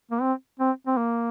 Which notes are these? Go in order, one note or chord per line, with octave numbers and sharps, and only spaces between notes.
A#3
C4
C4
C4
A#3